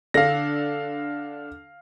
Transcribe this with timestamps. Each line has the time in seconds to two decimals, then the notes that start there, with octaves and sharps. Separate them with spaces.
0.14 D3 D4 A4 F5 A#6